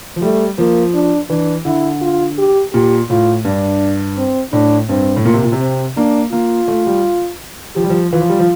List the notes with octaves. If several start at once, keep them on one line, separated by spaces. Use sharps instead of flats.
F3
G3 A3
F3 A#3
D4
E3 D4
D3 E4
F4
G4
A#2 G4
A2 F4
G2 D4
C4
A2 D4
G2 C4
A2
A#2 A#3
C3
A#2
C3
C4
A#3 D4
A#3 F4
A3
G3
F3 G4
G3
F3
E3 F4
F3
G3
F3